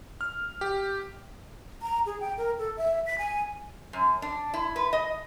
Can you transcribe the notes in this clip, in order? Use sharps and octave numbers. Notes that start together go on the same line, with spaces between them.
F6
G4
A#5
G#4
G5
A#4
A4
E5
B6
G#5
F#2
D4
E4
B4
D#5